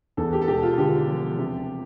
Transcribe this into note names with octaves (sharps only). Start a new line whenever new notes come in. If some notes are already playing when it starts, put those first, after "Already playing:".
E2 A4
G4
A4
E1 G4
F4
D3 G4
F3
C3